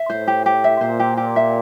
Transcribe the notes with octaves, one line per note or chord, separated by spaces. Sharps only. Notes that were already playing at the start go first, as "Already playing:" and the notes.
Already playing: E5
A2 C5
G4
G4
E5
A#2 C5
G4
G4
E5